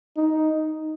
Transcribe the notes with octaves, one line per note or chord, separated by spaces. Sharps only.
D#4